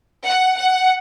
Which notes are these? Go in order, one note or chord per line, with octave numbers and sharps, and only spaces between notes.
F#5
F#5